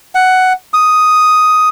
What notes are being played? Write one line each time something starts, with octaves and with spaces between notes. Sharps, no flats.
F#5
D#6